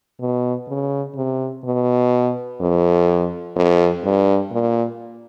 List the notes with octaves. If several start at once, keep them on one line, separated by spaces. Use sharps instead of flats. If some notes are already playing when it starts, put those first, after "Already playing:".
B2
C#3
C3
B2
F2
F2
G2
A#2